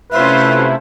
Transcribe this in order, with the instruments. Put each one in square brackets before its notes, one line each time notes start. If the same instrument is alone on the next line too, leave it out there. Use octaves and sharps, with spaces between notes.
[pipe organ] C3 A3 E4 [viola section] C#4 F4 C5 [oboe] B4 [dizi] E5